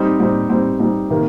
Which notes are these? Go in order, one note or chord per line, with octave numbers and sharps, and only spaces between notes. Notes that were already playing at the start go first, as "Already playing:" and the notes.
Already playing: G3 C4 D#4
G3 C4 D#4
G3 C4 D#4
G3 C4 D#4
C3 D#3 A#3